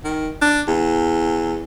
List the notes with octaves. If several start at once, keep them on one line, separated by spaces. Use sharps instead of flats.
D#3
D4
E2